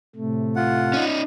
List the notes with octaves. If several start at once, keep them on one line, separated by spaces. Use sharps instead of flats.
A2 C3 A3
F4 F#5
C#4 D#4